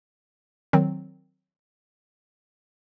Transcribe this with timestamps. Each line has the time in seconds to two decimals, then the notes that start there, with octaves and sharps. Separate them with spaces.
0.73 D#3 F#3 C4